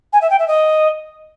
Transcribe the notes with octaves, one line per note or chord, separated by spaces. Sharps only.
G#5
E5
G5
E5
D#5